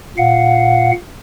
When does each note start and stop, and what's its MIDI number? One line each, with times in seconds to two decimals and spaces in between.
0.17 0.91 46
0.17 0.91 77
0.17 0.91 78